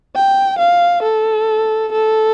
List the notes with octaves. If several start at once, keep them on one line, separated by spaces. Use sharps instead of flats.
G5
F5
A4
A4